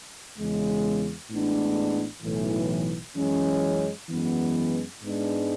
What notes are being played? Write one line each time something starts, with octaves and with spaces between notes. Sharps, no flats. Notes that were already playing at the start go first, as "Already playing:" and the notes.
E2 C#3 G#3
A1 A2 G#3 B3 D4
B1 A2 E3
F#2 E3 G#3 C#4
F#2 E3 G#3 B3
G#2 G#3 B3 D4